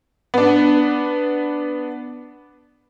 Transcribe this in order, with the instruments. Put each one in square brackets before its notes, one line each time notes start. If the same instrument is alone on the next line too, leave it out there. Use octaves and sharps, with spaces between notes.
[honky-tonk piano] B3 D4